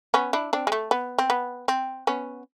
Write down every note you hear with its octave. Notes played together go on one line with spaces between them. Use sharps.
B3 C#4
D4 E4
C4 D4
G#3
A3
B3
C4
B3
C4
B3 C#4